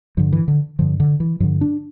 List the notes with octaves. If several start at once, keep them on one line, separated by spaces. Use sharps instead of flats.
G2 D3 F3
E3
D3
G2 D3 F3
D3
E3
G2 D3 F3
D4